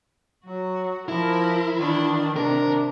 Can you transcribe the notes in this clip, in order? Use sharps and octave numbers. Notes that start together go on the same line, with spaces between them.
F#3 F#4
F3 E4 A#4
D#3 E3 D4
C3 D#3 D4 A#4